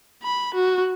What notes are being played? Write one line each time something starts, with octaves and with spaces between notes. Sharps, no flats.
B5
F#4